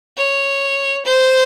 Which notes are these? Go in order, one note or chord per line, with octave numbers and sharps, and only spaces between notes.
C#5
C5